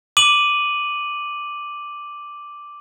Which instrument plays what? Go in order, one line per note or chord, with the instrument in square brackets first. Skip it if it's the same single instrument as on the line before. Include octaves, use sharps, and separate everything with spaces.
[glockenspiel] D6 D#7 F#7